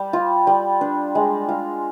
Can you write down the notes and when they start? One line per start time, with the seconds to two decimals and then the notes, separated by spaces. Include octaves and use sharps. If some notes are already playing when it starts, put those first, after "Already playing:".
Already playing: G3
0.13 F4
0.47 G3
0.81 D4
1.15 G#3
1.49 F4